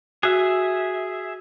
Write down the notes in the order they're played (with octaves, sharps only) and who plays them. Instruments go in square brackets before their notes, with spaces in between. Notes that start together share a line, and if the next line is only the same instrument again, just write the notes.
[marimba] F#4 [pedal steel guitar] G#4 E5